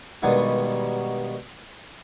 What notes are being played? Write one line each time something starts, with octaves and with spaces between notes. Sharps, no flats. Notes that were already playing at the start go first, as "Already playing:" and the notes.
G2 B2 D#3 G3 G#3 F#4